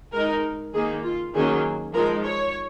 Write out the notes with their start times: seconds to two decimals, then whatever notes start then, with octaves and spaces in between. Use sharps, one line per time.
0.12 G#3 D#4 A#4
0.73 D#3 A#3 D#4 G#4
1.03 F4
1.34 D#3 F#3 A#3 C#4 G#4
1.94 F3 G#3 D#4 A#4
2.24 C#5